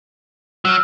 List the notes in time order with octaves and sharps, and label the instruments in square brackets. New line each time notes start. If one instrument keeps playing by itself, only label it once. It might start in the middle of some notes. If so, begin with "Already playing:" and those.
[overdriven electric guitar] F#3 [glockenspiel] E6 F6